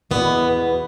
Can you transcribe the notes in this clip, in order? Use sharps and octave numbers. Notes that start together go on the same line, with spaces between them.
E2 B2 B3